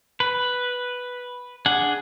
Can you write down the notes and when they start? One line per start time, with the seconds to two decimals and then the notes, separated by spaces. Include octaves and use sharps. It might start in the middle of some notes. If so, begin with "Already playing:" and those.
0.20 B4
1.66 D4 G#4 F#5